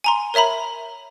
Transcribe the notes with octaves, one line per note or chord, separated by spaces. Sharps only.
G#5 A#5 C6
A#4 C#5 E5 A#5 B5